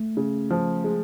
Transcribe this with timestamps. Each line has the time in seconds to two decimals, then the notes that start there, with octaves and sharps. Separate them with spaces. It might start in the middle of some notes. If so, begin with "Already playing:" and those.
Already playing: A3
0.17 C#3
0.50 F3
0.84 G#3